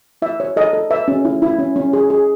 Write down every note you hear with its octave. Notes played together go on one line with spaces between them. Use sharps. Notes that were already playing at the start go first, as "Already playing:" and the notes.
E4 E5
C#5
A4 D#5
A4
B4 E5
C#4
E4
E4
C#4
C#4
G#4
G#4